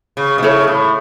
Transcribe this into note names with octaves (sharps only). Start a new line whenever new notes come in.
C#3
B2
C#3 E4 A4 C#5
A2